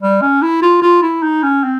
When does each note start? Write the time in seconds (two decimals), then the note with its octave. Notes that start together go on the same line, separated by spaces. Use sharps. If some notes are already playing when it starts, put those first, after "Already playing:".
0.02 G3
0.22 C#4
0.42 E4
0.62 F4
0.82 F4
1.02 E4
1.23 D#4
1.43 C#4
1.64 C4